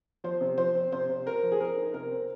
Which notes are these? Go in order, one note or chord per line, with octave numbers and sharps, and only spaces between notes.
F3 C5
C3
F3 C5
C4
C3 C5
C3
C4 A#4
F3
G#4
C4 A#4
D#4
C3 A#4
C4